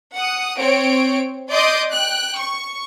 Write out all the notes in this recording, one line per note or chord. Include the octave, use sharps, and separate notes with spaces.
F#5 D#6
C4 C#5 D7
D5 D#5 C6 D6 D#6 G6
G5 F#6
C#6